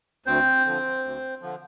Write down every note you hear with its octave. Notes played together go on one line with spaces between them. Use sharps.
D2 C4 C5
D3 F3
D2
D3 F3